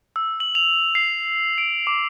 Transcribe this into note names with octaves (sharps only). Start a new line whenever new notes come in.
E6
F#7
F7
C7
D7
D6